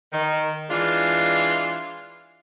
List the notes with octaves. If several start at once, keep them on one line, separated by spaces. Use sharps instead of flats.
D#3
E3 G#3 D4 F4